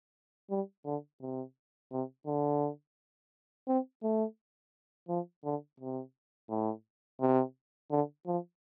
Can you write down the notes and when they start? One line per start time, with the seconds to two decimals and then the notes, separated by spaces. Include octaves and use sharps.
0.50 G3
0.85 D3
1.21 C3
1.92 C3
2.26 D3
3.68 C4
4.03 A3
5.09 F3
5.44 D3
5.80 C3
6.50 A2
7.21 C3
7.91 D3
8.27 F3